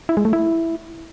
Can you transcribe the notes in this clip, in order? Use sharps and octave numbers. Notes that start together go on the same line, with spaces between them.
E4
G#3
A3
E4